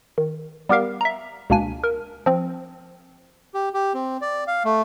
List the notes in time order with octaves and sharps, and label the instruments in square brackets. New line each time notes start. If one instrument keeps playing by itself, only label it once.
[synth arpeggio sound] D#3
G3 B3 G4 A#4 F5
E5 A#5
C#2 B2 A#3 D4 G#5
A#4
F3 C4
[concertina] G4
G4
C4
D5
F5
A3